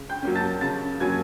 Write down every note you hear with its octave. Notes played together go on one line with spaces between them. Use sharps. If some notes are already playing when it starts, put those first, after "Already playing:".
Already playing: C#3
G5 G6
F#3 A#3 C#4
A5 A6
C#3 A5 A6
F#3 A#3 C#4 G#5 G#6